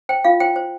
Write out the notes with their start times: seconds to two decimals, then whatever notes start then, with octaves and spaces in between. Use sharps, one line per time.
0.09 C5 G5
0.24 F4 F5
0.40 C5 G5
0.56 C5